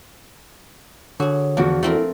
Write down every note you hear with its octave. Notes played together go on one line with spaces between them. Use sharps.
D3 F#4 G#4 C#5
E2 F3 D4 F#4
A3 C4 E4 A#4